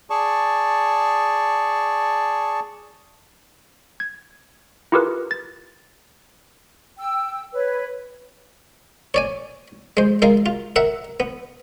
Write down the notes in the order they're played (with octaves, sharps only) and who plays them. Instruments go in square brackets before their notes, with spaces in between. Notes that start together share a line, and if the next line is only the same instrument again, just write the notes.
[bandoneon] G#4 D5 A5 C#6
[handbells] G#6
E4 F4 G4 G#4 A#4 B4
A6
[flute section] G5 E6
B4 C#5
[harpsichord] C#5 D5 G#5
G#3 C5
G#3 F4 A#4 F5
F4
A#4 E5 F#5
B3